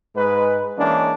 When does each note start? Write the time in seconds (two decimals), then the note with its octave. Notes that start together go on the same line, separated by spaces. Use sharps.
0.15 G#2 G#3 B4
0.76 E3 G#3 A#3 C#4 D4